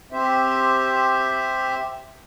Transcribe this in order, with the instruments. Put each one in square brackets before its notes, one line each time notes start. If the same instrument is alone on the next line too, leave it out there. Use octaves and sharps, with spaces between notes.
[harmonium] C4 G4 C5 E5